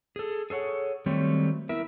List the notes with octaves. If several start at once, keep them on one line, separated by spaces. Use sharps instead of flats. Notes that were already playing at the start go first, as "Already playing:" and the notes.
G#4 A4
G#4 A4 C#5 F#5
D#3 F#3 G3 A3 C4 C#5
B3 E4 A#4 E5